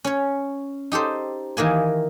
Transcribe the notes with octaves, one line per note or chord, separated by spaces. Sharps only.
C#4 C#5
D#4 G4 A4 C5
D#3 E3 A#3 G#5